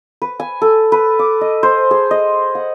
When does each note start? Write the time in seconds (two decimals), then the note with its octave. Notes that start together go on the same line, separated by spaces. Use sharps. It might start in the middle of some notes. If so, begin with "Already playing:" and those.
0.22 B4
0.40 G#5
0.62 A4
0.92 B4
1.19 D6
1.41 D#5
1.63 C5
1.91 G#4
2.11 D#5
2.55 F#5